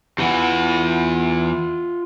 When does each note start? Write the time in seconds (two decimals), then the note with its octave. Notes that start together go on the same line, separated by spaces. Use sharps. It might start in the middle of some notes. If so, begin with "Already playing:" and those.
0.18 E2 E3 F4 F#5